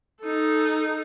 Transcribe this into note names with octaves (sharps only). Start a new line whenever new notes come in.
D#4 A4